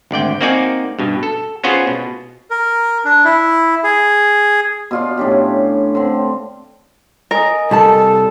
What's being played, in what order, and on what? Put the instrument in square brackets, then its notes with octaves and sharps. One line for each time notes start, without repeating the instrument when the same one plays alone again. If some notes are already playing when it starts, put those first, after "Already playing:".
[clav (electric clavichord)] G#1 D2 D5 G5
A#3 C4 D#4 F#4 D5 G#5
G2 B2
A4
B3 C#4 F4 F#4 G#4 C5
B2
[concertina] A#4
D4
E4
G#4
[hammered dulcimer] B2 F4 D5
A2 C#4 D4 G4
D3 C4
[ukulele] A#4 [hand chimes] D#5 G#5 D#6
[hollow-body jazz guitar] C2 G3 A5 [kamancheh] A4